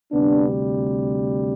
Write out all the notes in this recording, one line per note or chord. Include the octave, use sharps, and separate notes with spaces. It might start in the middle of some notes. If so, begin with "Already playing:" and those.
D2 C3 G3 B3 D4